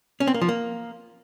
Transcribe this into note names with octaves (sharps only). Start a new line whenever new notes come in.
C#4
C4
A#3
F3
A#3